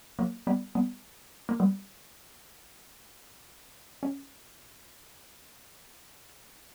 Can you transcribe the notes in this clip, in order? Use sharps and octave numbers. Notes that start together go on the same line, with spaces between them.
F#3 A#3
G3 B3
G3 B3
A#3
G3 B3
C#4